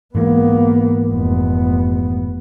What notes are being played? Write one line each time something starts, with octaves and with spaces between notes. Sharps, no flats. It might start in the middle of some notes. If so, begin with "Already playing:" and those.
G#2 E3 G#3 A#3 B3
F1 B3